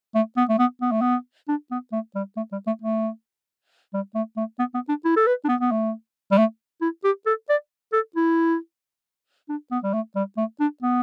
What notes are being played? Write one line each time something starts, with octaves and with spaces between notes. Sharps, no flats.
A3
B3
A3
B3
B3
A3
B3
D4
B3
A3
G3
A3
G3
A3
A3
G3
A3
A3
B3
B3
D4
E4
A4
B4
D4
B3
B3
A3
G3
A3
E4
G4
A4
D5
A4
E4
D4
B3
G3
A3
G3
A3
D4
B3